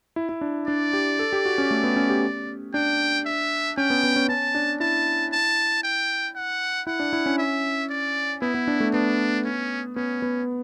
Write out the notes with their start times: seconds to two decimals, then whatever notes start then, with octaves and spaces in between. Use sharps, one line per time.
0.16 E4
0.29 E4
0.41 D4
0.68 D4 D5
0.93 G4
1.19 A4
1.33 G4
1.45 F#4
1.58 C#4
1.71 A3
1.84 B3
1.96 C#4
2.10 G4
2.74 D4 G5
3.26 E5
3.77 C#4 G5
3.90 B3
4.04 B3
4.16 C#4
4.29 C#4 A5
4.55 D4
4.80 E4 A5
5.32 A5
5.84 G5
6.36 F#5
6.87 E4 F#5
7.00 D4
7.13 E4
7.26 C#4
7.38 E5
7.90 D5
8.42 B3 E4
8.54 B3
8.68 D4
8.80 A3
8.93 B3 D4
9.45 C#4
9.96 B3 C#4
10.22 B3